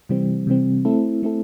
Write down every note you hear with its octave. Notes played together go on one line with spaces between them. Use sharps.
C3 E3 G3 C4
C3 E3 G3 C4
A3 C4 E4 A4
A3 C4 E4 A4